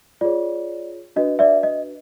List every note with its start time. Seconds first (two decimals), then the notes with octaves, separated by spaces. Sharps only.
0.21 F4 G#4 C#5 D5
1.16 D4 F#4 B4 D#5
1.39 D5 E5
1.63 D#5